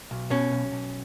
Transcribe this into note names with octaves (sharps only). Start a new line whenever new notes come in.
B1
B2 C#4
B1
B1